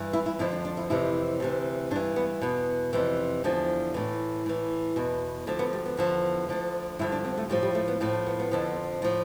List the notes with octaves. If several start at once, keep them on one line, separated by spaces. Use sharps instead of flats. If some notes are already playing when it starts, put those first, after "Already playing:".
Already playing: G2 E3
E4
E4
F2 D3 F3 E4
D4
D4
E4
F2 C3 E3 E4
D2 C3 E3
G2 E3 D4
B3
E2 B2 B3
F2 C3 E3
E2 D3 F3 D4
A2 E3
A2 E3
E2 B2
D2 D3 F3
B3
G3
B3
E2 D3 F3
D2 D3 F3
G2 D3 F3 E4
D4
C4
A3
A2 F3 G3
G3
A3
B3
A2 F3 C4
D4
B3
B3
F2 D3 F3
A2 F3